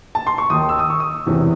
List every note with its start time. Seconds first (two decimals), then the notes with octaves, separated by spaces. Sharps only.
0.15 A5
0.27 C6
0.38 C#6
0.50 D#2 D#3 D#6
0.69 E6
0.79 D#6
0.90 C#6
1.00 D#6
1.26 E1 E2 C3 E3